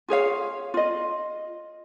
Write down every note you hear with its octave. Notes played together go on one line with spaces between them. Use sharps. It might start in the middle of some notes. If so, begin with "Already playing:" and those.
F4 G#4 C#5 F5
F4 D#5